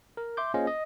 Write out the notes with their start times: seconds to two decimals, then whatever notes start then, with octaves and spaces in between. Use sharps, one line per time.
0.17 A#4
0.37 E5 C6 D6 G6
0.54 A#3 C#4 F4 G#4 C5 D#5
0.67 D#5